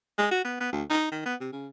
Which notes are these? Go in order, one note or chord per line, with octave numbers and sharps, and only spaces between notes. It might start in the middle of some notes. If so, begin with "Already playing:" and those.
G#3
F#4
B3
B3
D2
D#4
D#3
B3
C3
C#3